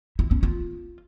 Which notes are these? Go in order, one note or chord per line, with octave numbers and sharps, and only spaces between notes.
E4
C#4
F4